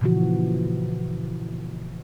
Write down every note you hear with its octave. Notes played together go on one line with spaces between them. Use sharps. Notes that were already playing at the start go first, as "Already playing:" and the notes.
A#2 C#3 E3 F3 F#4